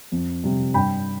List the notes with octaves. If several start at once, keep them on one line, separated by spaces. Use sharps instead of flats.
F2
C3 G3 C4
G2 G5 B5